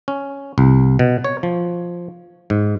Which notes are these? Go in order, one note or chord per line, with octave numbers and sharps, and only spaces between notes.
C#4
C2
B2
C#5
F3
G#2